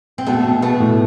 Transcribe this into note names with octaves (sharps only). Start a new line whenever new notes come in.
C4
B2 A3 B3
B2
A3 B3
A2